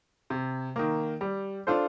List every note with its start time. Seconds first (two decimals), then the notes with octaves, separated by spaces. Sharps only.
0.30 C3
0.76 D#3 A#3
1.21 G3
1.67 D4 F4 A4 C5